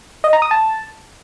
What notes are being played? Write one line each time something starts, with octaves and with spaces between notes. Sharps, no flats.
D#5
A#5
D#6
A5